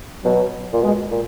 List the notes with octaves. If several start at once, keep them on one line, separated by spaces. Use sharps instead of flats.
B2 F#3
A#2
B2 G#3
A#2